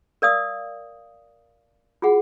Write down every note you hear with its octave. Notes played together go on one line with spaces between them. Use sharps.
A#4 D5 F5 D#6
F4 F#4 G#4 F#5